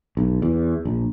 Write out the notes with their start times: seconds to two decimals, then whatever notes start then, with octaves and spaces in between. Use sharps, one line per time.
0.17 B1
0.42 E2
0.85 A#1